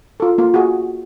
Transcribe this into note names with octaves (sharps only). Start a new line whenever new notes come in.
F4 A4
A#3 F4
F#4 G#4